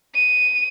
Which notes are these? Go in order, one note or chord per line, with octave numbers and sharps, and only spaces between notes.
D#7